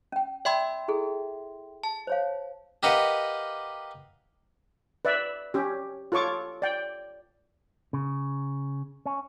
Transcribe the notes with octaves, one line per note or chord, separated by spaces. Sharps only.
C#4 G5
D5 E5 G5 B5 C6 E6
E4 G#4 A4
A5
C5 C#5 F5
G4 A#4 B4 D#5 F5 F#5
B4 D5 E5
C#4 G4
F4 A4 C#5 C#6 D6
D5 G5
C#3
C#4